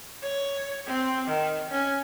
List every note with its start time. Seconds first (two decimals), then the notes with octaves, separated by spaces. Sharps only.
0.23 C#5
0.87 C4
1.27 D#3
1.71 C#4